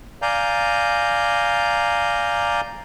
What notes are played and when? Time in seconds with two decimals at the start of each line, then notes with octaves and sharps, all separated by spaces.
0.22 D5 F5 G#5 A#5 G6